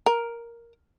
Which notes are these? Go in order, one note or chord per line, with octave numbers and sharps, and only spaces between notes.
A#4